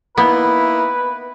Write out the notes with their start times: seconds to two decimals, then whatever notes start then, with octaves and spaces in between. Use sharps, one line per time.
0.18 A#3 B3 D#4 E4 B4